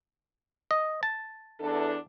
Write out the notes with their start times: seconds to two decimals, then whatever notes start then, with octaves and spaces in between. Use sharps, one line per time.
0.71 D#5
1.03 A5
1.60 E2 D4 A4